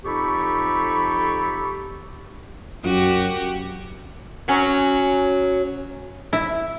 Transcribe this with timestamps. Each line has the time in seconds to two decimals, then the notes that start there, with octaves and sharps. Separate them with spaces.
0.05 F2 D#4 G4 A4 B5 C#6
2.84 F#2 F#4 G4
4.48 F#3 C#4
6.33 E4